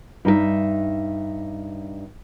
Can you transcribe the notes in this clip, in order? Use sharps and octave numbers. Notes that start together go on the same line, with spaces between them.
G2 D#4 G4 E5